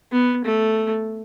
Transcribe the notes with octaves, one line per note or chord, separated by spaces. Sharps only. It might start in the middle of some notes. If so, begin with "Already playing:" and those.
B3
A3